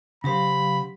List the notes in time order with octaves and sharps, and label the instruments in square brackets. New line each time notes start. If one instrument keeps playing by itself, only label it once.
[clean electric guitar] C#3 C5 [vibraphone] F#3 G4 F5 [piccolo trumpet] B5